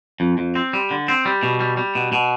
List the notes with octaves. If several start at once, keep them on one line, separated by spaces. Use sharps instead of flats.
F2
F2
C4
G3
D3
C4
G3
B2
G3
G3
B2
B2